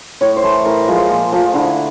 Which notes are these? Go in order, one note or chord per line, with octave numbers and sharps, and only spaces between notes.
A2 C#5
C5
E3 A3
A2 A#4
F3 G#3
A#2
F3 A3
D3 E4